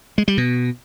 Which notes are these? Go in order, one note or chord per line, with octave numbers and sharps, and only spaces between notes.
G#3
G3
B2